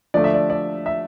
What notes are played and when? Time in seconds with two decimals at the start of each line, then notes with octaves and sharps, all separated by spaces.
0.14 D3 F3 A3 D5
0.24 E5
0.34 D5
0.50 D5
0.86 E5